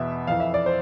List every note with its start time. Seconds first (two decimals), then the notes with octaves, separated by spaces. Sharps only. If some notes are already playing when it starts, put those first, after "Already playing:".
Already playing: E2 B2 E5
0.27 F2 E3 F5
0.40 E5
0.54 D5
0.66 C5